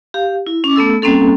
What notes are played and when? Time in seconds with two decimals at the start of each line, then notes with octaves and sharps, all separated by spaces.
0.14 G4 F5
0.47 E4
0.64 C#4 D6
0.76 A3 B3 A4 E6
1.02 G3 A#3 C4 C#4 A4